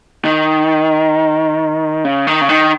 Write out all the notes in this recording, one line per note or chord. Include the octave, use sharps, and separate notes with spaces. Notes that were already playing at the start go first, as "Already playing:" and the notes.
D#3
C#3
D#3
C#3
D#3